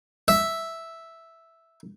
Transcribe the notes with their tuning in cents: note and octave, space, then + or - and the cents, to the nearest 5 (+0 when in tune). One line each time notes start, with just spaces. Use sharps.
E5 -5